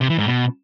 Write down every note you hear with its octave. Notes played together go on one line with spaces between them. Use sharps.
C3
E3
G#2
B2